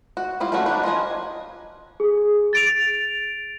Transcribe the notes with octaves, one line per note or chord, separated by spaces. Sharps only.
F#4
G3 E4 F4
G3 A3 A#3 C#4 F#4
D4 D#4 B4
F3 A#4 D#5 G#5
G#4
A6 D7 F7